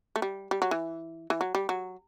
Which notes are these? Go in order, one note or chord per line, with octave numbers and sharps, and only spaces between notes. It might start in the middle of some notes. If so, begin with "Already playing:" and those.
A3
G3
G3
F#3
E3
E3
F#3
G3
F#3